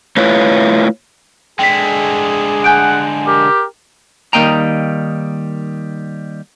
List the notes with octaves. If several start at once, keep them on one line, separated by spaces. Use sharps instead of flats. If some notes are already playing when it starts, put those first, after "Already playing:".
A3 E4 F4 B4 C#5
D3 G#3 G#4 G5 B6
F#5 G#5 G6 D7
G4 A#4
D#3 G3 A#3 D#5 G5 A#5